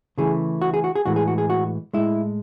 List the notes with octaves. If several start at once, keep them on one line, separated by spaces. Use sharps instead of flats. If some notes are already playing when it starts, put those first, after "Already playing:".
C#3 E3 A3 G#4
F#4
G#4
F#4
G#4
A2 E3 G#3 F#4
G#4
F#4
G#4
F#4
A2 G#3 E4